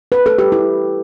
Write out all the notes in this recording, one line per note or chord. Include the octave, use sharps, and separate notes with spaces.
B4
A4
G4
E4